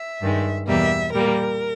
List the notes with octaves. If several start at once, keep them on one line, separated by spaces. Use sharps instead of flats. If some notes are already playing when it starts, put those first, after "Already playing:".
Already playing: E5
G2 D#3 G#3
E2 B2 G3 A#3 E5
A#2 G3 A#3 A#4